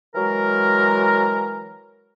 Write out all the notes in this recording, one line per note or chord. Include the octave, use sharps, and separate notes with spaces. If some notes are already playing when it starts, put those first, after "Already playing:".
E3 F#3 G#3 A#4